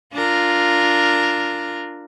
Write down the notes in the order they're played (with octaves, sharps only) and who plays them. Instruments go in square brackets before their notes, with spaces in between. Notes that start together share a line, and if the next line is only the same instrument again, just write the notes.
[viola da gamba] D4 F4 A#4